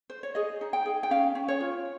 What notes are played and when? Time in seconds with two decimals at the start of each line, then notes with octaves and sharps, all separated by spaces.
0.10 C5
0.23 C#5
0.35 G#4 D#5
0.61 D#4
0.73 G5
0.86 G#4
1.03 G5
1.10 C#4 F5
1.35 C#4
1.48 C#5
1.61 F4